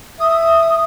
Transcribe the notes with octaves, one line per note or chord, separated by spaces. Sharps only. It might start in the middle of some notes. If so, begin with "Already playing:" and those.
E5 D#6